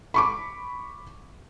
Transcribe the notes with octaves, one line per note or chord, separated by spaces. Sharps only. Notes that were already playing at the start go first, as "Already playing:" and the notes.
B5 C#6 D6